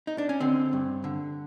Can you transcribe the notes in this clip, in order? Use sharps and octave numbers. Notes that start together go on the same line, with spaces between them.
D#4
D4
C#4
D3 C4
G2
D3